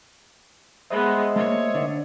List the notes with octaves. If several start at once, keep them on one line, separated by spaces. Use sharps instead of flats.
G#3 B3 C5 D#5 E5
A3 A#3 C#5
D3 D4 D5